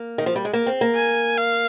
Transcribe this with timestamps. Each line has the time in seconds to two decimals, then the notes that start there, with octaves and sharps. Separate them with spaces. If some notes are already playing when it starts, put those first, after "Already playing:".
Already playing: A#3
0.18 D#3
0.26 F3
0.36 G3
0.45 G#3
0.53 A#3
0.66 C4
0.81 A#3
0.95 G#5
1.38 F5